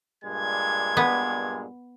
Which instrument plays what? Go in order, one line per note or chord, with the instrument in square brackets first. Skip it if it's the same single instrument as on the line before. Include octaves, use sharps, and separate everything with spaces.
[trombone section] G2 A#2 G#3 [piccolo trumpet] G#6
[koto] B3